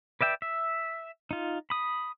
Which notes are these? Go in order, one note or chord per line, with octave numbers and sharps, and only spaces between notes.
B4 D5 E5 G5
E5
D#4 F4
B5 D#6